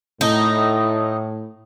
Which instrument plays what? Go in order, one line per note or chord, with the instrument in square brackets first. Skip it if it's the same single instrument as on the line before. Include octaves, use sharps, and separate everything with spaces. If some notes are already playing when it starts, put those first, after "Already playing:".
[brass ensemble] A2 [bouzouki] D#4